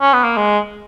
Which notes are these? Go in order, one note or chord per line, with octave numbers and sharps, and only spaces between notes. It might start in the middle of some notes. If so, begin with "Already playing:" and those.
C#4
B3
A#3
G#3